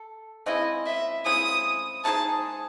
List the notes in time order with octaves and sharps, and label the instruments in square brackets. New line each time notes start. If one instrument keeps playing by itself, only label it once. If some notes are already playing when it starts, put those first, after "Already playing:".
Already playing: [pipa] A4
[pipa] C#3 G#3 C4 E4 [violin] D#5
[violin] E5
[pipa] C#3 G#3 C4 E4 [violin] D#6
[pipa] G#3 D#4 G#4 C5 [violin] A5